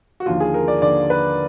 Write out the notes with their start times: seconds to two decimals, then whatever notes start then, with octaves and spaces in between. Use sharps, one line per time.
0.20 F#4
0.26 D#2 D3 F3 F4
0.40 G#4
0.54 A#4
0.68 D5
0.82 D#2 D3 F3 D5
1.10 B4